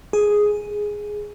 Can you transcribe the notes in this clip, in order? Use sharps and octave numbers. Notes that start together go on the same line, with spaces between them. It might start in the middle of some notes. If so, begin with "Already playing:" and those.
G#4